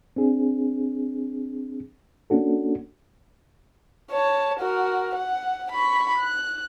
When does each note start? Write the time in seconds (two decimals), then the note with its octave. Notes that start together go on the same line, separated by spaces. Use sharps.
0.16 C4 D4 G#4
2.30 A#3 C#4 D4 F#4 A4
4.11 C#5 A5
4.60 F#4 A#4
5.15 F#5
5.71 B5 C#6
6.18 F#6